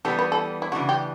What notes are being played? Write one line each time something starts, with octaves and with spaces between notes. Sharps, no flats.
E3 G3 B3 A4
B4
A4
E4
C#3 E3 A3 D4 F#4
G4